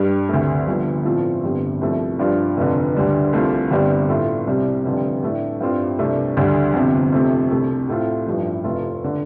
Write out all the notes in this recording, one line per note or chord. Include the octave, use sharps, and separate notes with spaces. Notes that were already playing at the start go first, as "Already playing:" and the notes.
Already playing: G2 G3 D4
D2 C3 A3
G1 G2 F3
A2 F3 A3 C4 F4
G1 G2 G3 C4
C2 C3 F3 A3
G2 F3 D4 F4
F1 F2 D3
D2 D3 G3 D4
C2 C3 A3 F4
G1 G2 G3 C4
A2 A3 F4
C2 C3 G3
F1 F2 D3 G3 F4
A2 A3 D4
G2 G3 C4 F4
C2 C3 A3 D4
D2 D3 G3
G1 F2 C3
F2 C3 A3
C2 C3 A3
A2 A3 C4 F4
A1 G2 F3
F1 F2 C3 A3 F4
D3